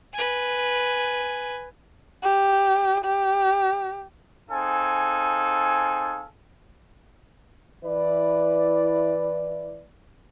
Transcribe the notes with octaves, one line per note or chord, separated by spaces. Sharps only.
B4 G#5
G4
G4
C4 D#4 G#4 A4 F5 G#5
E3 E4 B4 D5